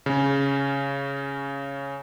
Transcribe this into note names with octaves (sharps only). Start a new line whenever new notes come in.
C#3 C#4